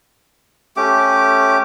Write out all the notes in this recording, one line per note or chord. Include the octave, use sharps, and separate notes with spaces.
A3 C#4 G4 D6